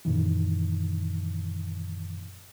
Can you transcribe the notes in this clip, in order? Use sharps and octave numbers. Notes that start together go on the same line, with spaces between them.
F#2 A#2 D#3 E3